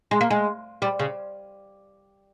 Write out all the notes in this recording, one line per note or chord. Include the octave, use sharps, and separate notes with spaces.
G#3
A#3
G#3
G3
C#3